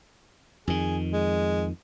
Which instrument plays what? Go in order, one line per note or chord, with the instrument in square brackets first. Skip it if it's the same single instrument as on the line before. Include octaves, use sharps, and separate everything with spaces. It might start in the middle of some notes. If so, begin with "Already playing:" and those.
[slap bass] F2 D#3 [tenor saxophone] G#4
[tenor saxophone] G#3